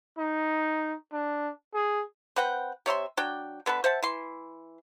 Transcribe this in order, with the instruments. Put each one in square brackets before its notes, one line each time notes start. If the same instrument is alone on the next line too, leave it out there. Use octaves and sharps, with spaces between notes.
[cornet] D#4
D4
G#4
[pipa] C4 B4 F#5 G5
C3 C#5 E5 C6
F#3 D4 G5
D3 B3 A4 B4
C5 E5 F#5 A5
E3 C6